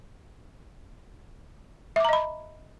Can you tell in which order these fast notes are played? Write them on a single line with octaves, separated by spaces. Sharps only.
E5 D6 A#5 D#5 B5